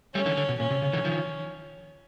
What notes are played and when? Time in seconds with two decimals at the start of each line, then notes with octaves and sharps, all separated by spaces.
0.15 G3 A3 C#4
0.26 D3 E3
0.37 D3
0.49 B2
0.60 A#2 C#4
0.70 C3
0.82 C#3
0.93 D3 E3
1.05 D#3 F3